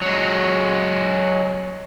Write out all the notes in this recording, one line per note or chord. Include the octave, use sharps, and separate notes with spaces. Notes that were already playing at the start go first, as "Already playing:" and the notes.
F#3 G#3